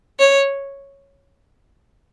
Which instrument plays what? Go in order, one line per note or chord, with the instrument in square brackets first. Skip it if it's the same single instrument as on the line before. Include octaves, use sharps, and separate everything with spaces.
[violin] C#5